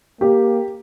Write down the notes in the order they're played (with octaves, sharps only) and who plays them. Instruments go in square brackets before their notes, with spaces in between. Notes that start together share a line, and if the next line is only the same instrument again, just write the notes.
[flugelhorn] A#3 [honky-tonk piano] G4